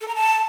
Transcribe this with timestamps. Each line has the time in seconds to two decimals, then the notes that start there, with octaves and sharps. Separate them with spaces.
0.01 A4
0.08 A#5
0.15 A5